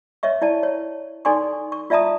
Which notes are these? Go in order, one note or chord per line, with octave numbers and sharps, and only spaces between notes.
C#5 D#5 E5 C#6
E4 D5 A5
C#5
D#4 A4 D5 G#5 C6 C#6
C#6
F4 D5 E5 A5 A#5 D#6